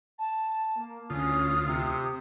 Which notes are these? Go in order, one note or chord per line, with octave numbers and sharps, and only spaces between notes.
A5
A#3
D2 C#4 F4 D#6
C3